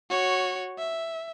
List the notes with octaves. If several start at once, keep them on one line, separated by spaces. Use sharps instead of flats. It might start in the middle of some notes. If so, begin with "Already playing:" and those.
F#4 C#5
E5